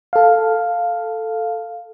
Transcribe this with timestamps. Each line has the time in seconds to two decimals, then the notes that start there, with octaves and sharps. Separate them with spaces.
0.13 A4 F5